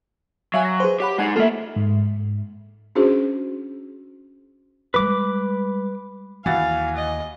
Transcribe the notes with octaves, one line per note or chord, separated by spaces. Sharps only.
F#3 E5 F5 G#5
A#6
G#4 B4 C5
G4 C#5 F#5 B5
G#3 D#4 F#5 G#5
A3 A#3 F4 A4 E5
G#2
C#4 D4 F#4 G#4 C5
G3 G#3 B4 D6
D#2 E3 F#4 F5 G#5 A6
D#5